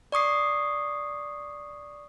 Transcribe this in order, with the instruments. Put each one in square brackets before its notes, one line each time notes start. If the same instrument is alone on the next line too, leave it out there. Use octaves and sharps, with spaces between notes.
[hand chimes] D5 C#6 D#6 C7